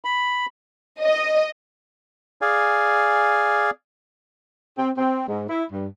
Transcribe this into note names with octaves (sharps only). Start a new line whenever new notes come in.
B5
D#5
G#4 D5 F5 G#5
C4
C4
G#2
E4
G2